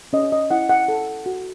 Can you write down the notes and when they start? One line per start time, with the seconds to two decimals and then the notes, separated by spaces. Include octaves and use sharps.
0.13 C#4 D#5
0.32 D#5
0.51 E4 F#5
0.69 F#5
0.88 A4
1.26 F#4